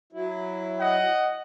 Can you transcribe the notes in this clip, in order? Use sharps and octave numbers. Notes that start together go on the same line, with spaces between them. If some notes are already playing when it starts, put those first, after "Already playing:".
F#3 E4
D#5 F#5